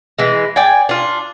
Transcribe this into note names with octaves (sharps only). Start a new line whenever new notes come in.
E3 G#3
D5 G5 G#5
D4 F4